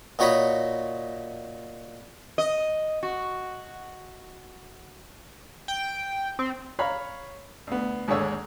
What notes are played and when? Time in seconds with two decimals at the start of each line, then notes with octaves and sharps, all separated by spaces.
0.19 A#2 D#4 F#4 C#5 B5 D#6
2.38 D#5
3.03 F#4
5.68 G5
6.39 C4
6.79 C#5 F5 A#5 B5
7.67 D2 B3
8.08 D#2 G#2 D3 G#3 C#5 E6